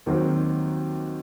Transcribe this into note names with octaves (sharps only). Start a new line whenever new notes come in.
D#2 D#3 F#3 C4 F#4